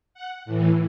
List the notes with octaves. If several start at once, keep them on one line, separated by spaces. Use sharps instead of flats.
F#5
A2 E3